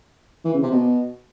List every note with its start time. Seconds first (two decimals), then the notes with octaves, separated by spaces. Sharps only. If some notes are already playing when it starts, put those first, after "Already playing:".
0.45 E3
0.54 C#3
0.62 C3
0.71 B2